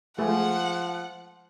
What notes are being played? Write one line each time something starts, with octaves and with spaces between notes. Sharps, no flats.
F3 G#3 A3 G#4 F#5